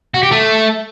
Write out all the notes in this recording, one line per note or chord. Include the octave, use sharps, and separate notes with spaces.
F#4
G4
A3